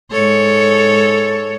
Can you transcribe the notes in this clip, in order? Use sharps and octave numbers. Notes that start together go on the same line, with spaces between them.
G#2 A4 C#5